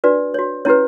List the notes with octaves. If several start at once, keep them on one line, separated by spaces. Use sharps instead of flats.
D4 F#4 B4 D5
F#4 C#5
C#4 E4 G4 B4 C#5